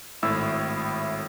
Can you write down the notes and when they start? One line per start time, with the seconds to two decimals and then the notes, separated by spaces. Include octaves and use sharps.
0.23 G#1 A2 E4 E6